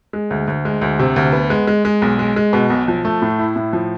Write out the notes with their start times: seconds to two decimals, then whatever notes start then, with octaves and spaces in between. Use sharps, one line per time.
0.13 G#3
0.30 D2
0.48 D2
0.65 G#3
0.81 D2
0.99 C3
1.16 D2
1.33 B3
1.50 G#3
1.67 G#3
1.85 G#3
2.02 B1
2.19 G#3
2.36 G#3
2.53 B2
2.70 B1
2.88 F3
3.05 A3
3.22 A2
3.39 E4
3.56 A2
3.73 F3